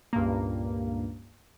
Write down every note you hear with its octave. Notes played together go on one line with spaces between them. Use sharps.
C#2 G2 A#2 A#3